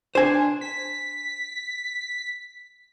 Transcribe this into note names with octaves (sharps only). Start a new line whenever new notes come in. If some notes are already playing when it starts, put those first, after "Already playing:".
D4 C5 G#5
B6